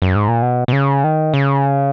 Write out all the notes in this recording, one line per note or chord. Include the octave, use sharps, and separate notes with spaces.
F#2
G#2
A#2
B2
B2
C#3
D#3
C#3